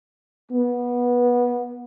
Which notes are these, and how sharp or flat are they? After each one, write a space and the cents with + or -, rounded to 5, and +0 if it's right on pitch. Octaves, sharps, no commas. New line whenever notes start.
B3 -20